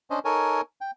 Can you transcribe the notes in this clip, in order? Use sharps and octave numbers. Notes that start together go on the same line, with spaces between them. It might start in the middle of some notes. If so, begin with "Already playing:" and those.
C#4 D4 C5 D#5
D#4 A4 A#4 C#5 G#5
G5